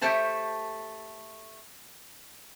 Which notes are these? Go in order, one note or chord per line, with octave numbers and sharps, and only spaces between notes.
A3 G4 C5 C#5 A5